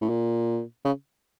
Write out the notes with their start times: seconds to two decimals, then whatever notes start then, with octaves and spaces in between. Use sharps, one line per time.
0.01 A2
0.09 A#2
0.85 C#3